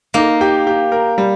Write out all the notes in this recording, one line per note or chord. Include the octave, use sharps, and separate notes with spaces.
A#3 D#4
G4
G4
A#4
G3